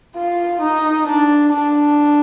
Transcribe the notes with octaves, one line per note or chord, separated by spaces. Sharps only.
F4
D#4
D4
D4